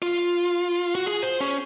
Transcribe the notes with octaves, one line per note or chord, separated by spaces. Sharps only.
F4
F#4
G#4
C5
C#4